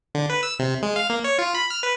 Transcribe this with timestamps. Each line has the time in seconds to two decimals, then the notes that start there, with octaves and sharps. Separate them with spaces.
0.15 D3
0.30 B4
0.43 E6
0.59 C3
0.82 G#3
0.96 F5
1.10 A#3
1.24 C#5
1.39 F4
1.55 B5
1.70 F6
1.83 B4